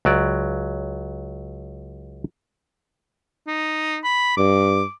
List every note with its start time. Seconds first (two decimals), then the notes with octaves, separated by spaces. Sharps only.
0.05 C#2 F#3 D5
3.47 D#4
4.04 B5
4.37 G2 D6